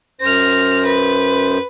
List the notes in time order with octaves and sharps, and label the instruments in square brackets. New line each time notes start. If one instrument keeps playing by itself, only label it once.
[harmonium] F#2 C5 [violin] F6 A#6
[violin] B4